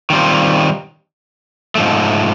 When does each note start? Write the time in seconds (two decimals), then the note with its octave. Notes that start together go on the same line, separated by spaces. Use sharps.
0.10 D#3 G3 C4 F4
1.75 G#2 F3 A3